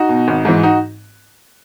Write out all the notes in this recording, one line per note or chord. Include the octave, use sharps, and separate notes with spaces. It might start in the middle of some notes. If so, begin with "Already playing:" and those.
Already playing: D#4 F#4
B2
G#1
G#2 E3
D#4 F#4